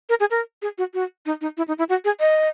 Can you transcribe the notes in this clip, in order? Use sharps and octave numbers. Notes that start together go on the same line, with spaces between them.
A#4
G#4
A#4
G#4
F#4
F#4
D#4
D#4
E4
D#4
E4
F#4
G#4
D#5